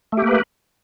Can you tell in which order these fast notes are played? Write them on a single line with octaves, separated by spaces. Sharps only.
A3 G4 A#3 B4